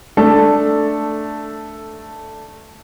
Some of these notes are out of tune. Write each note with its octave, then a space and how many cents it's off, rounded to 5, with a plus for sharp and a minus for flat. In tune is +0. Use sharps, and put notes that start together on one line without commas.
A3 +0 D4 +0 A4 +5